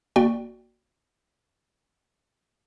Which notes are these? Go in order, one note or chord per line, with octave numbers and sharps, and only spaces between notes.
G1 A#3 F#4 D5 G5